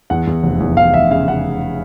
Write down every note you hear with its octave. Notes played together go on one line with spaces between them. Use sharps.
E2 F#5
E2
F1
E2
E2 F5
F1 E5
C#3 F5
C#3 F#5